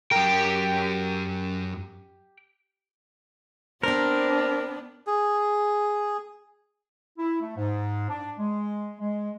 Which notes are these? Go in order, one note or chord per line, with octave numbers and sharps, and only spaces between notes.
F#2 G4 A#4 G5
B3 C4 D4 A#4 C5
G#4
E4
A3
G#2
D4
G#3
G#3